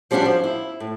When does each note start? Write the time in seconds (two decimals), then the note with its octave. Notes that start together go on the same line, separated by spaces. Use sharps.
0.11 F3 G3 B3 C#4 D4 F#4
0.25 F3
0.44 E4
0.80 A2